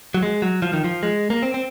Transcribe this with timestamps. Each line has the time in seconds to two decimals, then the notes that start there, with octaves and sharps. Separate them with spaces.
0.14 F#3
0.23 G#3
0.42 F#3
0.62 F3
0.73 D#3
0.84 F3
1.03 G#3
1.30 A#3
1.43 C4
1.54 C4